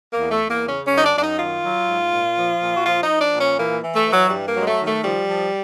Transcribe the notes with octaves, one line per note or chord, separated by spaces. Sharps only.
A#3
E2
A3
E2
A#3
C#3 C#4
C#4
F#2
D#4
D4
F#2 D4
D#4
D#3 F4
F#3
G#2
A#2
F3
A#2
F#4
F3 F4
D#4
F3
D4
A#2
C#4
E3 A#3
E3
A3
E3
F#3
G2 G3
A#3
F#3 G#3
A3
D#3
A3
F3 G3
F3